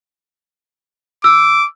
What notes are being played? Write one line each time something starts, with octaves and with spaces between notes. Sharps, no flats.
D6 E6